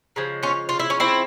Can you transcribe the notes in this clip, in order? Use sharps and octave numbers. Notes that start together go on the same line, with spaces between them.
C#3 F3 G#3
C#4 F4
F4
E4
C#4
C4 E4